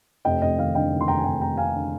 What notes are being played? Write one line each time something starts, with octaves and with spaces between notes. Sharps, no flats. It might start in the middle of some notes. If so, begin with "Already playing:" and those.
F1 D#5 G5
F1 D#5
D#2 F5
D3 D#5 G5
D#2
C6
F1 G5 A#5
G#5
F1 G5 A#5
F1 G5 A#5
F1 F5 G#5
D3